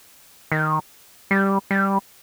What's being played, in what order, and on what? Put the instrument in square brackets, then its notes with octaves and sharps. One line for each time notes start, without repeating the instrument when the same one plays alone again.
[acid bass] D#3
G3
G3